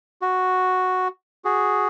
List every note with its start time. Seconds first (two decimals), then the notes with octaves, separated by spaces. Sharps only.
0.22 F#4
1.45 F#4 G#4